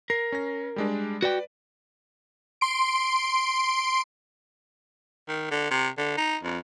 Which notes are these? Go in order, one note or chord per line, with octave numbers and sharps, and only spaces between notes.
A#4 C7
C#4 A#6
G3 G#3 D4
F#4 B4 D5 G5
C6 D7
D#3
D3
C3
D3
D#4
F2